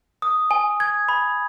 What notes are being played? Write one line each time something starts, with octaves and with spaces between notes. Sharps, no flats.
D#6
G#5
G#6
B5